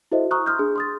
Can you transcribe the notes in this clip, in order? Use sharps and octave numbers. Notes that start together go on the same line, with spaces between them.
E4 F#4 A4 C5 D#5 E5
A#5 C#6 D#6 F6 F#6
C6 D#6 F6 G6
D4 G#4
C6 D#6 A6